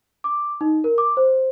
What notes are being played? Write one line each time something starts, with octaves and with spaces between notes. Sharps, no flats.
D6
D#4
A#4
D6
C5